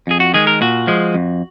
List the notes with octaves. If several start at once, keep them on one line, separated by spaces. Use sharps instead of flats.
F2 G#4
F#4
D#3 G#3 G#4
A#4
A#2 F#4
F3 G#3
F2